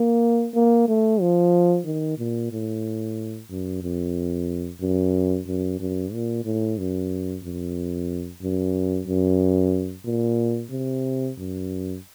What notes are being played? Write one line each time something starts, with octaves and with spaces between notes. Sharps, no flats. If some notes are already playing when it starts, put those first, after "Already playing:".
Already playing: A#3
A#3
A3
F3
D#3
A#2
A2
F#2
F2
F#2
F#2
F#2
A#2
A2
F#2
F2
F#2
F#2
A#2
C3
F#2